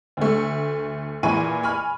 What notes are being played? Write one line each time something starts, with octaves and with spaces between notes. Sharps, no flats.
D2 A3
A#2 E3 G#4 B5 C#6 D#7
G#5 B5 C#6 F6